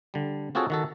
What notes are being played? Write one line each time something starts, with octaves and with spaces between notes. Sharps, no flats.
D3 G3
C4 F4 F#4 G#4 A4 C#5
D#3 F#4 A4